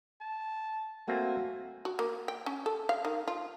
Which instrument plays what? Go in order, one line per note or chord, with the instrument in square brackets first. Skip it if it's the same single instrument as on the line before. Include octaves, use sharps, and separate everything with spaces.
[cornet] A5
[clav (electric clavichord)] A3 A#3 C4 [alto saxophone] F#4 [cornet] G#5
[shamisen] F#4
A#3
G5
C#4
A4
F5
D#3
F4